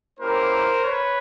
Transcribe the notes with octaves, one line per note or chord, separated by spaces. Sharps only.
A#3 C#4 E4 G4 A#4 C5
B4 C#5